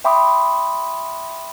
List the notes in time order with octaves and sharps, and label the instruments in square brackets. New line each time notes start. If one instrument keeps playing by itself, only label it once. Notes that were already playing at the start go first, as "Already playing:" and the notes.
[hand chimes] E5 G5 B5 C6 D6 D#6